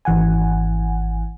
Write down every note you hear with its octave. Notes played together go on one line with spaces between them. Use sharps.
G#1 E3 F#5 G#5